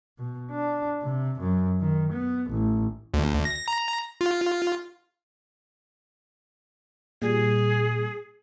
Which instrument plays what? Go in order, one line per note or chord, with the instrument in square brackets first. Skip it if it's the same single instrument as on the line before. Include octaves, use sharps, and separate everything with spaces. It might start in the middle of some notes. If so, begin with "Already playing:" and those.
[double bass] B2
D4
C3
F#2
D#3
B3
A1
[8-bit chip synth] D2
A#6
A#5
F4
[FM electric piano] A#2 G3 [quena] G#4